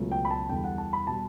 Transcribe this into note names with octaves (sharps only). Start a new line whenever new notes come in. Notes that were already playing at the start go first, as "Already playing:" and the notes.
Already playing: C#2 B2 F#3 A3
G5
B5
A5
E2 D3 G3 G5
F#5
A5
B5
B2 G3 A5